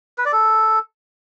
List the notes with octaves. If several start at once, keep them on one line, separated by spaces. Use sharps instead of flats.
B4
D5
A4